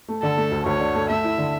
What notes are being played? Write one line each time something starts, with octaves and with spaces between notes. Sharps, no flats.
A3
D3 A4
A3
D2
D2 C#5
D3
A3
A3 E5
E4
D3